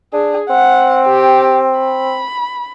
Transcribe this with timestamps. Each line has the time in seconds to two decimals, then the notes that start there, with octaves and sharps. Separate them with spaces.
0.13 D4 G#4
0.50 C4 F#5
1.06 G4
1.80 B5